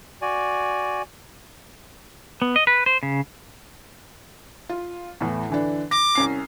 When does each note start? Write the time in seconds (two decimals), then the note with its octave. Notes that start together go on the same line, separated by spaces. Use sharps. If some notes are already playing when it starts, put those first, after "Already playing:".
0.22 F#4 D5 G#5
2.42 B3
2.56 D#5
2.67 B4
2.86 C5
3.03 C#3
4.69 F4
5.20 E2 A2 E3
5.50 D3 E3 D4
5.91 D6 A#6
6.15 C2 C#4 C7